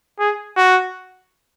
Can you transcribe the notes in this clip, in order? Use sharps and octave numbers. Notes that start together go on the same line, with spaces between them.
G#4
F#4